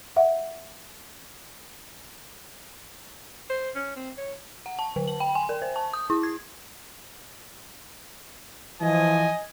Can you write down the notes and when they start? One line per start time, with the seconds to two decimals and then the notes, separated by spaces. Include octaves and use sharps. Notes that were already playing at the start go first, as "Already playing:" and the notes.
0.16 E5 F#5
3.50 C5
3.75 C#4
3.96 C4
4.18 C#5
4.66 F#5
4.79 A5
4.96 D3
5.08 F#7
5.20 G5
5.35 G#5
5.49 A#4
5.62 C5
5.76 A5
5.93 D#6
6.10 E4
6.23 G#6
8.82 E3 F3 D#5 G#5